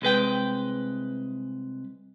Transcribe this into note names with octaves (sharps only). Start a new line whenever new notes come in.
C2 G#3 B4 G5